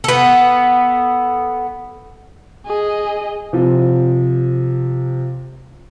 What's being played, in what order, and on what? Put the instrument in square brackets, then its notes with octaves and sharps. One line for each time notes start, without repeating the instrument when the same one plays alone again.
[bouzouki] B3 A4
[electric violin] G#4 D#5
[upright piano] C3 F3